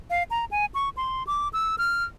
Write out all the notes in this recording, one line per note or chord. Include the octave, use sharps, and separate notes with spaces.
F5
A#5
G#5
C#6
C6
D6
E6
F6